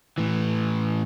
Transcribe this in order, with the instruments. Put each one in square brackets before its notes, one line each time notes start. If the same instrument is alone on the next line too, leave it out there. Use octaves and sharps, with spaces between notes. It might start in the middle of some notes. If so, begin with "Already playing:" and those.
[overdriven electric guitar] A2 E3